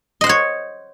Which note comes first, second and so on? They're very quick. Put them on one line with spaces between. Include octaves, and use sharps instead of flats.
D#5 C5 F#5 C#5